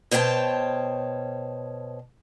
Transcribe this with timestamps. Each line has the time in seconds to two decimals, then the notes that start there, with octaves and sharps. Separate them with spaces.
0.11 B2 C5 C#5 G5 A5